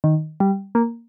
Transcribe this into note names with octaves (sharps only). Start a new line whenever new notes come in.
D#3
G3
A#3